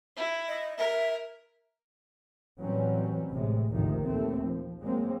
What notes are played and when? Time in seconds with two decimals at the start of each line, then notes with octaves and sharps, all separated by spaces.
0.17 E4
0.48 D#5
0.78 A#4 E5
2.60 A2 E3 F#3 G3 C4 C#4
3.30 A1 A2 C3 G#3
3.71 G#1 D2 C3 D#3 F3
4.04 A#1 D#2 A3 C4
4.46 F3
4.82 F#3 G#3 A#3 C4